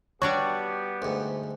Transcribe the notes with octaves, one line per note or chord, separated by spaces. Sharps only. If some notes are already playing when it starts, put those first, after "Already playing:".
G3 B3 D4 F#4 G4 C#5
D2 G#2